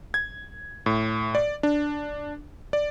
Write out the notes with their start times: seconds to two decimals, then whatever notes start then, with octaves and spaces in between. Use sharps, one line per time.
0.14 G#6
0.86 A2
1.35 D5
1.63 D4
2.73 D5